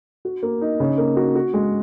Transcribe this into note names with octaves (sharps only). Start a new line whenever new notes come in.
F#4
A#3
D#4
C#3
A#3
F#4
F#4
G#3